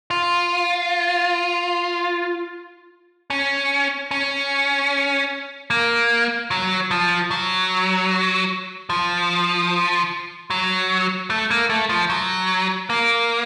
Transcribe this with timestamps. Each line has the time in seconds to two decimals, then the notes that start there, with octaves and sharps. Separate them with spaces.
0.11 F4
3.30 C#4
4.11 C#4
5.70 A#3
6.51 F#3
6.91 F3
7.31 F#3
8.90 F3
10.50 F#3
11.30 A3
11.50 A#3
11.70 A3
11.89 F3
12.10 F#3
12.90 A#3